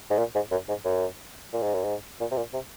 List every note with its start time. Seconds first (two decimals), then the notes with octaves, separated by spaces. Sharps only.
0.10 G#2
0.18 A#2
0.35 G#2
0.51 F#2
0.69 G#2
0.85 F#2
1.53 A#2
1.63 G#2
1.74 F#2
1.84 G#2
2.21 A#2
2.31 C3
2.37 A#2
2.54 C3